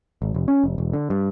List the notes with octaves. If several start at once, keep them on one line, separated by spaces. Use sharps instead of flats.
G#1
F1
C#4
F1
E1
D3
G2